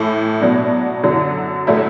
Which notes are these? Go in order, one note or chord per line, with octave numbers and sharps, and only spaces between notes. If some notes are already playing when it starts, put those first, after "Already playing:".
Already playing: A2 E3 A3
B2 F#3 B3 D4
F#2 D3 F#3
A2 F#3 A3 E4